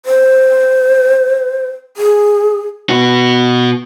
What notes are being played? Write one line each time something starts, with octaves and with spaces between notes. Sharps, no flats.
C5
G#4
B2 F#4